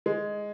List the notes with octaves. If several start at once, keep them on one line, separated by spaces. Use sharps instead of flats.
G#3